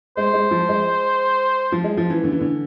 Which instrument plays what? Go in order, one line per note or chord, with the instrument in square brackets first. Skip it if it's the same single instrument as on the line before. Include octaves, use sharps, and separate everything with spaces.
[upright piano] G#3 [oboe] C5
[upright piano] G#3
F3
G#3
F3
G#3
F3
E3
D3
E3
D3